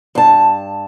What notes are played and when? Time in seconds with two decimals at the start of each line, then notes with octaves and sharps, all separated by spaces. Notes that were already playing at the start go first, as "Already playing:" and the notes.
0.15 G2 A5